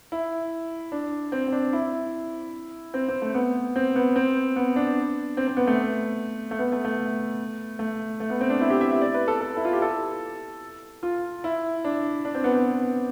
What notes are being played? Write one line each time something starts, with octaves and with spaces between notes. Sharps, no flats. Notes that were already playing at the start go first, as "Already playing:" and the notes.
E4
D4
C4
C4
D4
E4
C4
C4
A3
B3
C4
B3
C4
B3
D4
C4
C4
B3
A3
A3
B3
A3
A3
A3
A3
B3
C4
D4
E4
G4
E5
E5
D5
B4
A4
A4
E4
F4
G4
A4
F4
E4
D4
D4
C4
B3
B3